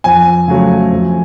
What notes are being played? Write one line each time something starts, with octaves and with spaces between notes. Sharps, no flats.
F2 G#5
C#3 F#3 A3
F2